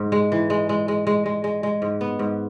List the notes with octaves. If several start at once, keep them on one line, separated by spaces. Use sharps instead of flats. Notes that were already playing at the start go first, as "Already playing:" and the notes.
Already playing: G#2
G#3
E3
G#3
G#3
G#3
G#3
G#3
G#3
G#3
G#2
B3
G#2